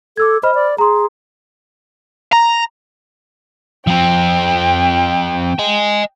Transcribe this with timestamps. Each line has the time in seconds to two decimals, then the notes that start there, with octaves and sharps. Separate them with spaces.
0.17 A4 D6 E6 G#6
0.43 C5 D#5 B5 F6
0.55 D5
0.78 G#4 A#5 C6
2.32 A#5
3.87 F3 C4 G5
5.59 D#5 G#5